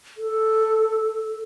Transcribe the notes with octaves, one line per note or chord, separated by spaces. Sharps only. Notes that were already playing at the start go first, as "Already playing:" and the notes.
A4